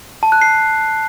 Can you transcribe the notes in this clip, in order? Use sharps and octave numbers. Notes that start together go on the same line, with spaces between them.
A5
F#6
C7